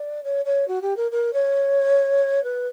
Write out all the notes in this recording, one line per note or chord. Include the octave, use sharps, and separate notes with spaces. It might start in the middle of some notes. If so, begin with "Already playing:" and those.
Already playing: D5
C#5
C#5
F#4
G4
A#4
A#4
C#5
B4